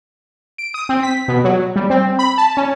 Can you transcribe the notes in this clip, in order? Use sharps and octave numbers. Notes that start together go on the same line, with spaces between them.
D7
D#6
C4
B6
B2
F#3
G3
C4
B5
A5
C#4